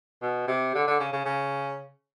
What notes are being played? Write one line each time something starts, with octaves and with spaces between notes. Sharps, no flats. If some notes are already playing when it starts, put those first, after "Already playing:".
B2
C3
D3
D3
C#3
C#3
C#3